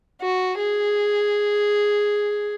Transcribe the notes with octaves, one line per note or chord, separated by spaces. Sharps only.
F#4
G#4